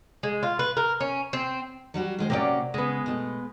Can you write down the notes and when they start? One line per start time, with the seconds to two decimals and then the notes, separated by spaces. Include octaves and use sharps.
0.23 G#3
0.43 F4
0.59 B4
0.77 A#4
1.00 C#4
1.33 C4
1.94 F#3 G3 F#4
2.19 D#3 G#3 C5
2.30 C3 F#3 A#3 C#4 D5
2.74 C#3 G#3 B3
3.06 B2 A3